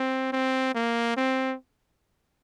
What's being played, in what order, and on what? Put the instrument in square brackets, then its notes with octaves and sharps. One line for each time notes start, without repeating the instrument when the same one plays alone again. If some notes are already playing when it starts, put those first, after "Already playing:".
Already playing: [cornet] C4
C4
A#3
C4